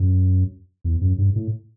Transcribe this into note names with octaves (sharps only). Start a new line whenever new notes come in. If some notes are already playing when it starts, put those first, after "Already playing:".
Already playing: F#2
E2
F#2
G2
A2